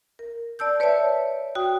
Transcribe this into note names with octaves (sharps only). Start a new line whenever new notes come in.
A#4
D5 A5 E6 G6
B4 C#5 D5 E5 A5
F#4 G5 D#6